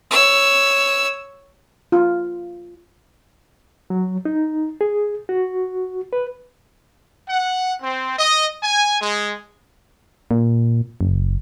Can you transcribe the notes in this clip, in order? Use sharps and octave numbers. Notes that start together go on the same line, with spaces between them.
C#5 E6
F4
F#3
D#4
G#4
F#4
B4
F#5
C4
D#5
G#5
G#3
A#2
F#1